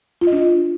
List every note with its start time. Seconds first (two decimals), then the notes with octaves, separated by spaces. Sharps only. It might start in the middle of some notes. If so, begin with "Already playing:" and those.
0.21 F4
0.27 D#5
0.33 D4